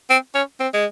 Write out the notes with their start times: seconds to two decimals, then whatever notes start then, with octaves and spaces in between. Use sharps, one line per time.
0.10 C4
0.35 C#4
0.60 C4
0.74 G#3